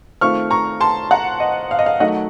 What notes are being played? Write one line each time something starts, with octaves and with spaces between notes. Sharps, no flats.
D#3 A3 C4 F4 C#6 F6
A#5 C#6
A5 C6
F#5 A#5
D#5
F5
D#5
F5
D#3 F#3 A3 D#5 F#5